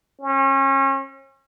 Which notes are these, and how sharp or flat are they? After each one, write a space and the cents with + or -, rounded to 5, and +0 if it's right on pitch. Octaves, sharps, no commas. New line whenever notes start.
C#4 -35